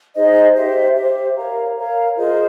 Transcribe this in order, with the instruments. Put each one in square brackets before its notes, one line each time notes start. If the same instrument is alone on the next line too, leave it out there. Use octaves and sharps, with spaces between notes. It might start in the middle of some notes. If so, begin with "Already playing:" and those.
[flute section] D#4 G#4 C5 D#5
G4 C5 E5
G4 C5 E5
A#4 C#5 F5 A#5
A#4 C#5 F5 A#5
F4 G#4 C5 D#5